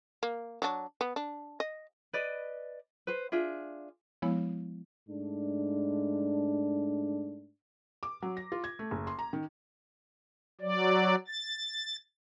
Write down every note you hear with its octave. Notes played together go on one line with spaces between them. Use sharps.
A#3
F#3 D4
B3
D4
D#5
B4 D5 D#5
B4 C5
D4 F4 G#4 E5
F3 G#3 B3 E4 C#5
G#2 A3 D4
D6
F#3
A#6
F4
G#6
A3
F#1
C6
A#5
D#3
F#3 D5
A6